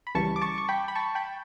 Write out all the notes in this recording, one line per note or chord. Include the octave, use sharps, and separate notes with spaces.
B5
C#2 C#3 E3 G3 A5 C#6
D6
A5 C#6
C#6
G5 B5
B5
A5 C#6
G5 B5